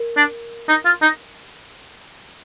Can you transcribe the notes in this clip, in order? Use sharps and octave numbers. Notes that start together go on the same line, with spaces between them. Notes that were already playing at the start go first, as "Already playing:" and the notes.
Already playing: A#4
D4
D#4
F4
D#4